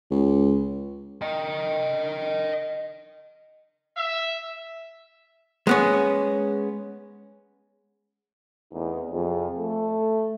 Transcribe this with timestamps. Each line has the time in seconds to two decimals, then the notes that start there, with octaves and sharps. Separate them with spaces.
0.11 C#2
1.22 D#5 G5
3.97 E5
5.67 G#3 B3 C#4
8.73 E2 A3 C4 D#4
9.11 F2 C3 F4 G#4
9.58 A3 A4